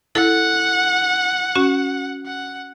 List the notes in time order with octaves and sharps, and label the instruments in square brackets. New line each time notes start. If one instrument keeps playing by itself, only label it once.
[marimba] E4 A4 [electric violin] F#5
[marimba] C#4 F#4
[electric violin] F#5